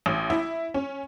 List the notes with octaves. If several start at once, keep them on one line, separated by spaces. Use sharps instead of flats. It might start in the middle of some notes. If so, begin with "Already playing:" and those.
A1
E4
C#4